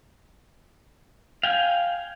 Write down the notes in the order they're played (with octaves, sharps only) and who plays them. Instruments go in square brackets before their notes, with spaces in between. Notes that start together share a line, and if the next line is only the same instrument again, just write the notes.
[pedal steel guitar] F5 G5 G#5